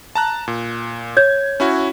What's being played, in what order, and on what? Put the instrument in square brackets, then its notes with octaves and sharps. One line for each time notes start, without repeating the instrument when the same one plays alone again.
[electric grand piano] A5 A#5 F#6
A#2
[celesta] C#5 G6 [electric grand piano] G#6
[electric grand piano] C#4 E4 F#4